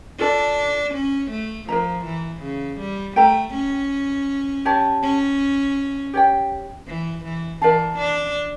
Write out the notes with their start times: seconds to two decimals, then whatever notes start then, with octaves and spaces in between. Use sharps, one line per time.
0.19 D4 F4 A4 D5 A5
0.94 C#4
1.30 A3
1.68 F3 A#4 E5 A#5
2.05 E3
2.42 C#3
2.79 G3
3.16 A3 A4 E5 G5 A#5
3.53 C#4
4.65 G4 C#5 E5 A5
5.03 C#4
6.14 G4 C#5 G5
6.87 E3
7.24 E3
7.62 E3 A#4 D5 F5 A5
7.98 D4